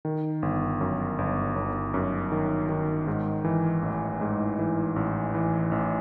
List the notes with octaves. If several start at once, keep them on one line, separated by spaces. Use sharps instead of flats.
D#3
G1
F#2
G1
G1
F#2
D#3
D#3
G#2
E3
A1
G#2
E3
A1
E3
A1